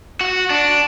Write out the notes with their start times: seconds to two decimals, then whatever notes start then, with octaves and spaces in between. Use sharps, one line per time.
0.21 F#4
0.50 D4